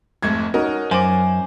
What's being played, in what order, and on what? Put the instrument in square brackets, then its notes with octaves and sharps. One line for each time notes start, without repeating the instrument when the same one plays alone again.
[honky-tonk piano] F1 G#2 A3 [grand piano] G#6
[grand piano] C#4 F#4 A#4 [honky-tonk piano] D#4
[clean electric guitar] F#2 [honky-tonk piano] C5 [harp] G#5 D6